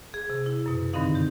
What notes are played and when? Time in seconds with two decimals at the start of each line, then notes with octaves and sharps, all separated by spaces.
0.14 G#4
0.30 C3
0.46 E4
0.66 F#2 B2
0.93 G2 D3 D#3 C4 D#4 F5
1.15 G4